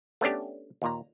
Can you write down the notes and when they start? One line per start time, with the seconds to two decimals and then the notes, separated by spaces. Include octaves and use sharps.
0.21 A3 B3 C#4 D4 G4
0.82 D#2 A#2 A#5